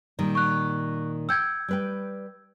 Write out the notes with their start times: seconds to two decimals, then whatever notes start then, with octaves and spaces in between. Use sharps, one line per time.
0.19 A#2 D#3 G3
0.35 C#6 F#6
1.29 F#5 G5 E6 G6 G#6
1.68 G3 B4 G5